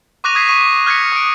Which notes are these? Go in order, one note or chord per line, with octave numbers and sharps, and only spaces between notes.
C#6 D6 F#6 A#6 D#7 F7
D#6 G#6 B6 C7 D#7
C#6 B6 D#7
F6 F#6 G#6 A#6 B6 C#7
D#6 D7